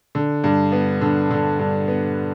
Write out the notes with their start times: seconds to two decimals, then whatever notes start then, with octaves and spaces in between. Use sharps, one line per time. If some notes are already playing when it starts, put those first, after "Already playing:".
0.15 D3
0.44 G2
0.72 B3
1.01 D3
1.31 D3
1.59 G2
1.88 B3